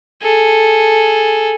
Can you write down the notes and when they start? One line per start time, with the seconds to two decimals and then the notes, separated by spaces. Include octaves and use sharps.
0.23 G#4 A4